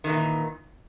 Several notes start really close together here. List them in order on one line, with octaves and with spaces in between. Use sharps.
D#3 E3 A#2